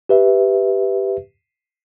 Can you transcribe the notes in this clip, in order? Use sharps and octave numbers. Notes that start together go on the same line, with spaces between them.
G4 B4 E5